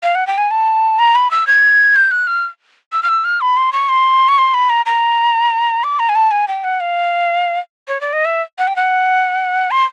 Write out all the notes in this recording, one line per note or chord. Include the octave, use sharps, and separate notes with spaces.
F5
F#5
G5
G#5
A5
A#5
B5
E6
G#6
G6
F#6
F6
E6
F6
E6
F6
B5
C6
C#6
C6
C#6
C6
B5
A#5
A#5
D6
A#5
G#5
A5
G#5
G5
F#5
F5
C#5
D5
D#5
E5
F#5
G5
F#5
C6